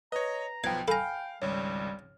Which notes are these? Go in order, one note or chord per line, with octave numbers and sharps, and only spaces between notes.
B4 C#5 D#5 A#5
B1 F3 B3 F5 G5 G#6
A4 F5 G5 G#5 A#5 B5 F6
G#1 C#2 G3 C#5